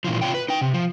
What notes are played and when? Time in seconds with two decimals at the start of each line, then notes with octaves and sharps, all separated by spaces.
0.04 A#2 E3 F3
0.22 F2 C3 D#4 F4 C#5 G5
0.34 B4
0.49 D#4 G5
0.61 C3
0.74 F3